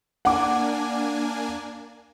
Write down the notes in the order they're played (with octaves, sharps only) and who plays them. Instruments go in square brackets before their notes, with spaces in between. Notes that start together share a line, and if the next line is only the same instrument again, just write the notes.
[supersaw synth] A#3 D4 G#5 [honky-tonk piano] F#5 D6